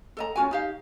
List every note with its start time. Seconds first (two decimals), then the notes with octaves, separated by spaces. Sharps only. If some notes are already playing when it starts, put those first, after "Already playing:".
0.17 A4 D#5 A#5
0.36 C#4 F4 F#4 G#5
0.51 D#4 G4 F5